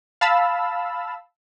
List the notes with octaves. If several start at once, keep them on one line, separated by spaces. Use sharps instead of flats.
F5 A5 B5 E6